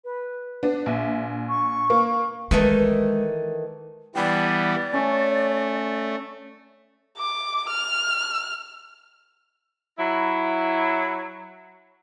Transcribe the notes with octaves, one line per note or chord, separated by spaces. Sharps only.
B4
B3 D4
A#1 E5
C#6
A#3
D#3 E3 G#3 A3
E3 G3 B3 D5 G5 A5
A3 C#4
D6
F6
F#3 E4